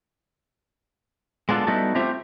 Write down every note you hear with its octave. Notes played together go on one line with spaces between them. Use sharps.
G#3 B3 D4 F4 A4
G3 B3 D#4 E4 F#4 A4
A3 C4 F4 G4 C5 E5